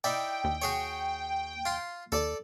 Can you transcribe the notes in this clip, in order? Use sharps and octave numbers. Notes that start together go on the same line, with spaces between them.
D#4 E4 D5 G5
D#2
F#4 G#4 C#5
F4 C6
D#2 A4 D5 A5